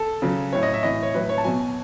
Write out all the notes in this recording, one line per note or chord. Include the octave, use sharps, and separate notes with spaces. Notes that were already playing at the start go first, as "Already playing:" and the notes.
Already playing: A4
C#3 F#3
A2 F#3 C#5
D#5
E5
A2 E3 D#5
C#5
A2 F#3 B4
C#5
A5
B2 F#3 G#5